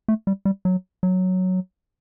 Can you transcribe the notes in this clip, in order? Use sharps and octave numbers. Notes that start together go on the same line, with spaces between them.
A3
G3
G3
F#3
F#3